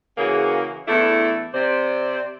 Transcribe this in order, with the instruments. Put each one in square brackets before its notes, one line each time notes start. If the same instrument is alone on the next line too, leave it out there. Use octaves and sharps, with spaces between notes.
[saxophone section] C#3 E3 A#3 C#4 F#4 G#4
E2 A3 D4 E4 A4
C3 C5 D5